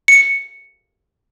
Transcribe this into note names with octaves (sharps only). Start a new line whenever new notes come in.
C#7